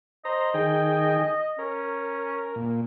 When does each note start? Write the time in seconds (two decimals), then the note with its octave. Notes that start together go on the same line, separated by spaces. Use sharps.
0.25 C5 D#5 A#5
0.54 D#3 G#4 G5
1.59 C#4 A#4
2.56 A#2